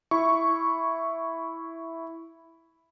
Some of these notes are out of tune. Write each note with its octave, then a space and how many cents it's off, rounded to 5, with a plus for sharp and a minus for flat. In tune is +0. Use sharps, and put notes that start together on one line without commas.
E4 +0 C#6 +0